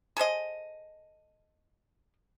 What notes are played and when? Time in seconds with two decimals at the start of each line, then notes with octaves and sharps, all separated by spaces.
0.17 G#4 A4 C5 D#5